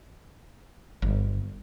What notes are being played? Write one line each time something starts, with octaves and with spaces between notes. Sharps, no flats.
G1